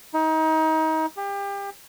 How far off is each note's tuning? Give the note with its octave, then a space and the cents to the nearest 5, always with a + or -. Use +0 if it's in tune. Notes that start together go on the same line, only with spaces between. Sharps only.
D#4 +30
G4 +30